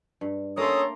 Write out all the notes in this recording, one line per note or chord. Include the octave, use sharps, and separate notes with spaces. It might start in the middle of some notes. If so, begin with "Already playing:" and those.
G2
A3 A#3 C#4 A4 C#5 A#5 C6 D#6